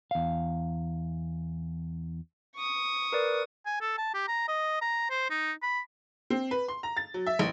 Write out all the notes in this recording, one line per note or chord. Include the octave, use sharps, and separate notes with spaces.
E2 F5
C#6 D#6
A#4 B4 D5
G#5
A4
A5
G4
A#5
D#5
A#5
C5
D#4
B5
C4
B4
C6
A#5
A6
F#3
E5
A1